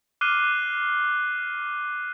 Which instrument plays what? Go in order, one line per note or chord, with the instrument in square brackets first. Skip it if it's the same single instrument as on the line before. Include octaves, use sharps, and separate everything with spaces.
[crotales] D6 F6 F#6 C7 D#7 G7